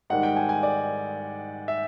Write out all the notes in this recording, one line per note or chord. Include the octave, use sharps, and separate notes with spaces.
G#2 D#3 G3 F#5
G5
G#5
G#5
D5
E5